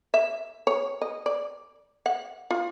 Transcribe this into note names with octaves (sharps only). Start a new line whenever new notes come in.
E5
C#5
D#5
D5
F#5
F4